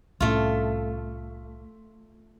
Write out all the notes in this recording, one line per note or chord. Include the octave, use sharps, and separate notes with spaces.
C2 A2 A3 C#4 F4